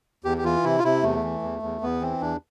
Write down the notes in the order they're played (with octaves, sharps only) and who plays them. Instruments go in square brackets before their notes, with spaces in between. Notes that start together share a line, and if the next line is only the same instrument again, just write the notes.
[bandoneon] E2 G4
G4
E3 F4
C3 E4
F4
C3 E4
E2 A3
E3
E2
E2
E2 B3
E3 C4
E2 D4